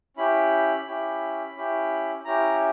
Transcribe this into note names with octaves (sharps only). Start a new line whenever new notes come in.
C#4 E4 G4 B5
C#4 E4 G4
C#4 E4 G4
C#4 E4 G4 A#5